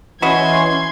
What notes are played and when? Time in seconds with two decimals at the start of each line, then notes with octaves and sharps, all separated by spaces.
0.22 E3 C#4 F#4 B4 D#5 C6 G#6